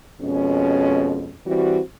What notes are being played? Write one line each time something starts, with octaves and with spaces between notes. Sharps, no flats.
F2 B2 G#3 C#4
E3 G3 C4 F#4